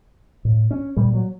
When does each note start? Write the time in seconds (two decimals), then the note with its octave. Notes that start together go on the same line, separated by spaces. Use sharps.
0.45 A2
0.71 C#4
0.97 A#2 G3
1.14 F#3